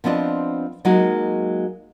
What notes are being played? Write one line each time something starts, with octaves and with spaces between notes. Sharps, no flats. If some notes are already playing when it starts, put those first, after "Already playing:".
F3 B3 C4 D4 D#5
F#3 G#3 A#3 D#4 F#4